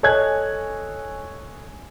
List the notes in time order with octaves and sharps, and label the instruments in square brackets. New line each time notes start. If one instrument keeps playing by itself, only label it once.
[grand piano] A4 C#5 D#5 G#5 F#6 G#6